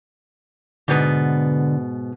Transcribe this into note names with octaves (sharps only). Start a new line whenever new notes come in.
G#2 B2 D3 B3